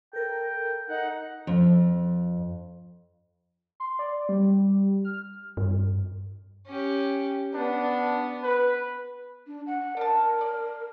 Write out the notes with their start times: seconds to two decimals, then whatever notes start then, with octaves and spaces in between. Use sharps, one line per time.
0.13 A4 A#4 G5
0.88 D#4 D#5 F#5 G6
1.47 F2
3.80 C6
3.99 D5
4.29 G3
5.05 F6
5.57 G2
6.67 C#4 G4
7.54 B3 D4
8.44 B4
9.47 D4
9.66 F#5
9.97 D4 A#4 A5
10.41 D5